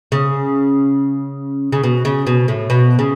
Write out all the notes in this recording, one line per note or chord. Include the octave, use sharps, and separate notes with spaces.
C#3
C#3
B2
C#3
B2
A2
B2
C#3